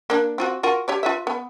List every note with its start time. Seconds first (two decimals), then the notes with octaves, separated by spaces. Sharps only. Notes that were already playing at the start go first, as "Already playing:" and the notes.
0.10 A#3 D4
0.38 C4 F4 F#4
0.63 F4 F#4 A#4
0.88 G4 C#5 D5
1.03 F4 B4 E5
1.27 B3